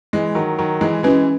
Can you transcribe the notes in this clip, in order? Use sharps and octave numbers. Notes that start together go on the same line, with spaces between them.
E3 G#3
D#3 F#3
D#3 F#3
E3 G#3
E3 G#3 C#4 F#4 B4